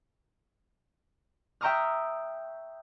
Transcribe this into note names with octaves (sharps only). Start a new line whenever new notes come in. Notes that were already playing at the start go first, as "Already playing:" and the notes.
E5 G5 A#5 C#6 D#6 F6